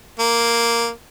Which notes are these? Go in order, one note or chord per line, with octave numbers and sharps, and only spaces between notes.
A#3